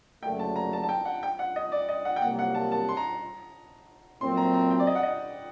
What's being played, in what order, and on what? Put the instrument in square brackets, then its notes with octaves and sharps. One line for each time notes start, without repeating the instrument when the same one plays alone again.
[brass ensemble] F#1 F#2 D3 A3 [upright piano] G5
[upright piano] A5
A#5
A5
A5
G5
F#5
G5
F#5
D#5
D5
D#5
F#5
G5
[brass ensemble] C2 C3 F#3 A#3 [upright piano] F#5
[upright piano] F#5
A5
A5
C6
A#5
[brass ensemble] A#2 F#3 A3 C4 [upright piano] C6
[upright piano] A#5
A#5
G5
D5
D#5
F#5
D#5